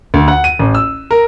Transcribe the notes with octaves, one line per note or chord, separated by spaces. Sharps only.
D2
F#5
D#7
A1
E6
A#4